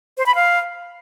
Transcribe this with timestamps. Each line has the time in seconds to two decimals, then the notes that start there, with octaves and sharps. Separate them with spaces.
0.17 C5
0.26 B5
0.35 F5